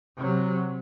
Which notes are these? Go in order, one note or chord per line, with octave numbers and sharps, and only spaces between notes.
C3 F#3